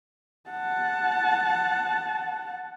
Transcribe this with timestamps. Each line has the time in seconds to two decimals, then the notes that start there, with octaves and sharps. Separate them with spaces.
0.50 F#5 A5